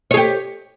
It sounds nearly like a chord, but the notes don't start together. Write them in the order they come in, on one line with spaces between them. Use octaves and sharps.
C#5 G#4 G4